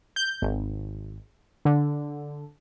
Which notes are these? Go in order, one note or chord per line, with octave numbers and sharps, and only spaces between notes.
G6
G#1
D3